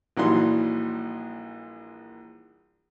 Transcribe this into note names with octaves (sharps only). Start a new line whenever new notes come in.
A#1 E3 F#3 G3 D#4 C6